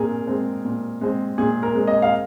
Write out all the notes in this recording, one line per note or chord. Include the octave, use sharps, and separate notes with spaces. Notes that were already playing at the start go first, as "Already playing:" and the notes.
Already playing: A#2 G#4 A#4
G#3 C4
A#2
G#3 C4
A#2 G#4
A#4
G#3 C4
D#5
F5